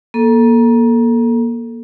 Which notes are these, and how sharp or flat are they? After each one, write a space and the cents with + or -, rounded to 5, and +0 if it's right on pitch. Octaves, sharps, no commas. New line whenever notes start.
A#3 +25 A4 +0